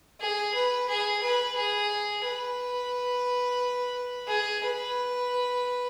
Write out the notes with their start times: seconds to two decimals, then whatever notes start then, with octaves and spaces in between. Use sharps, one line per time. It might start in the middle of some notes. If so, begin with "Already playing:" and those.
0.20 G#4
0.54 B4
0.88 G#4
1.22 B4
1.56 G#4
2.24 B4
4.28 G#4
4.61 B4